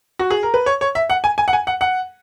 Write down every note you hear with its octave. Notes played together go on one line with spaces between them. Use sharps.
F#4
G#4
A#4
B4
C#5
C#5
E5
F#5
G#5
G#5
F#5
G#5
F#5
F#5